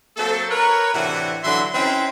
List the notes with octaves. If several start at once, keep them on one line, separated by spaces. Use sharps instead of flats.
F#3 A#3 C4 A4
A#4 B4 C#5
A2 C3 E3 D4 F#4
D3 E3 F#3 D4 E5 C6
C4 C#4 D#4 E4 B4 G5